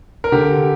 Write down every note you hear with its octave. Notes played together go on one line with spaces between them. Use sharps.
A#4
D3 G4